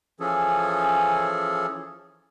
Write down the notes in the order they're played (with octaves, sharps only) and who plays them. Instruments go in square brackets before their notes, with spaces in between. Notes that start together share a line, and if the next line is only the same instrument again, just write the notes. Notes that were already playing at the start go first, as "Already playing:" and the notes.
[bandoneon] E3 F3 C#4 G#4 A4